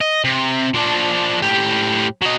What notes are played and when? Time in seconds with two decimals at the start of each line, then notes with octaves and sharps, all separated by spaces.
0.01 D#5
0.24 C3
0.74 F3 D4
1.42 A2 G4
2.22 F#3 D#5